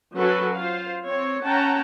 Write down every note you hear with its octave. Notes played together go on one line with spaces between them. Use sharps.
F#3 C#4 F#4 A4 B4
F4 C5 F5
C4 C#5
C#4 F#5 G5 A5 A#5